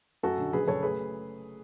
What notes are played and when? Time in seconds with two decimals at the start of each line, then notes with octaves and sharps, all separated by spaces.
0.23 F#2 F#4 A4
0.38 D3
0.53 F#1 G#4 B4
0.67 F#1 A4 C#5
0.82 A3 G#4 B4